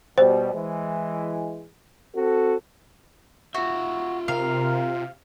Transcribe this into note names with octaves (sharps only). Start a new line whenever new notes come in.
B2 G3 C5
E3 G#3
C4 F#4 A4
F4 F#4 E5
C3 A#4 F5